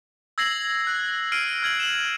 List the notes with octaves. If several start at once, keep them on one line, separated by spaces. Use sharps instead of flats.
E6 G#6 A#6 C7 F#7
F#6
F6 C7 D7 D#7
F6 G#6 F#7
E7 F#7